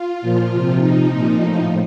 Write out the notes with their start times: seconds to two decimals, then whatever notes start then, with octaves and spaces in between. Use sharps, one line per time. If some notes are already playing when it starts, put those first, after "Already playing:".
Already playing: F4
0.21 A#2 F3
0.50 C3 F3
0.79 C3 F3 D#4
1.10 A#2 F3
1.39 A2 F3